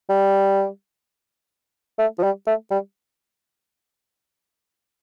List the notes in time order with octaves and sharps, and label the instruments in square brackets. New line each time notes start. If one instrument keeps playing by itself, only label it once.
[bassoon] G3
A3
F3
G3
A3
G3